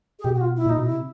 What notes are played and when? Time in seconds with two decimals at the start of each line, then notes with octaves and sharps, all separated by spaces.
0.19 G#4
0.24 B2 G4
0.35 F#4
0.41 F4
0.57 E4
0.66 A#2 D#4
0.78 B2
0.83 E4
0.89 C3